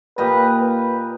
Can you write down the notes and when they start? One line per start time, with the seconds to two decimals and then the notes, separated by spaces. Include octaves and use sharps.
0.18 A#2 G4 B4 D#5
0.58 B4